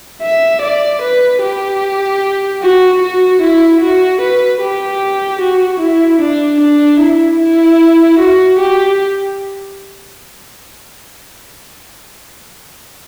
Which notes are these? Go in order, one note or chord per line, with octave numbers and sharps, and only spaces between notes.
E5
D5
B4
G4
F#4
F#4
E4
F#4
B4
G4
F#4
E4
D4
D4
E4
E4
F#4
G4